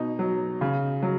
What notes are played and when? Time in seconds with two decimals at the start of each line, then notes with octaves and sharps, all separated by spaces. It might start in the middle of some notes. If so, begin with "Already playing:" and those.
Already playing: B2 D#4
0.19 F#3
0.61 C#3
1.03 F#3